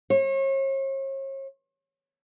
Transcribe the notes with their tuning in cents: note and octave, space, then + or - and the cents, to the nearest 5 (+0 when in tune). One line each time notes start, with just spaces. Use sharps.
C#5 -40